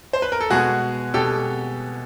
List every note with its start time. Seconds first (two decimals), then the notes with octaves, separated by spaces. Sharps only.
0.13 C5
0.22 B4
0.32 A#4
0.41 A4
0.50 B2 G#3 B3 F#4 G#4
1.14 B2 G#3 B3 G4 A4